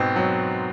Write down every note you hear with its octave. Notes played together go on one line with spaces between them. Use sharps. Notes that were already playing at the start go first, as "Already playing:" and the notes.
Already playing: G#2 B2 C4
F#3